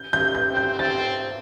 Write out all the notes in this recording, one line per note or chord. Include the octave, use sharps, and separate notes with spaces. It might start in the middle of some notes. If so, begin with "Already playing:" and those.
Already playing: G6
G6
G6
C4
G6
C4 A6